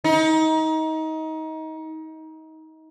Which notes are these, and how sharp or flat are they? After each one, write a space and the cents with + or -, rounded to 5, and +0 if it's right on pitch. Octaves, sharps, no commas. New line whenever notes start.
D#4 +25